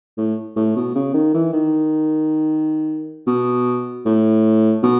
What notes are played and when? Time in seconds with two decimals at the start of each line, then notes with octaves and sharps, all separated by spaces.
0.17 A2
0.56 A2
0.76 B2
0.95 C#3
1.14 D#3
1.34 E3
1.53 D#3
3.27 B2
4.05 A2
4.83 B2